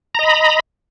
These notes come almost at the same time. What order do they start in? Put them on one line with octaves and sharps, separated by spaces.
A#5 D#5 B5